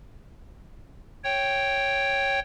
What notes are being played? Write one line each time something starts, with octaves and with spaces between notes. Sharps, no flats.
C#5 G5